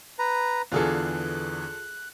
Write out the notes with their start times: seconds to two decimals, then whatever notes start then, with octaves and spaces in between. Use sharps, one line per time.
0.19 B4 A#5
0.72 E2 D3 E3 F4 G#4 A4 F#6